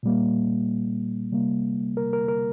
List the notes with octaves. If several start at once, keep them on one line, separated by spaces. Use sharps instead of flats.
A#2 G3 A#3
C3 G3 A#3
A#4
A#4
A#4